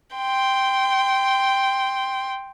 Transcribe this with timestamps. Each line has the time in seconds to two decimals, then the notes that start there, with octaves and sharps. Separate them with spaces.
0.16 G5 C6